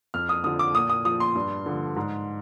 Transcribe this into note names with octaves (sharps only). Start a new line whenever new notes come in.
F2 F6
D#6
D3 F3 D#6
D6
A#2 D#6
D#6
F3 D#6
C6
G2
D3 F3
G#2